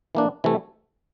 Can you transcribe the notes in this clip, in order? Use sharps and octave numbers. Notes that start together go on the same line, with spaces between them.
E3 A#3 D4
C3 E3 A3